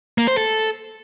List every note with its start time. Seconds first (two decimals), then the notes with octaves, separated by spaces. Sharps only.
0.18 A#3
0.28 C5
0.37 A4